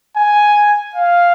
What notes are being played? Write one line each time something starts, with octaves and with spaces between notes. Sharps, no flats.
G#5
F5